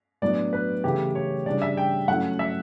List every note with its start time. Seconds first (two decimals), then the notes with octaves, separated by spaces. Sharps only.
0.22 A2 F#3 B3 D4 D5
0.53 B4
0.84 C#3 E3 A3 E4 G4
1.15 C#5
1.46 C#3 G3 D4 D5
1.62 E5
1.77 G5
2.08 F#3 A3 C#4 E4 F#5
2.39 E5